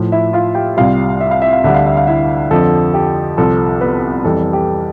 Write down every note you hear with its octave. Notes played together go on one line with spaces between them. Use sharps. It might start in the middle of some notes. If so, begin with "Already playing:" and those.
Already playing: A2 F3
E4 E5
F4 F5
G4 G5
C2 C3 G3 F4 F5
E5
F5
E5
F5
D2 D3 G3 E5
F5
E5
F5
E4 E5
F2 D3 F3 A4
G4
C2 C3 F3 A4
B3 B4
F2 E3 G3 A4
G4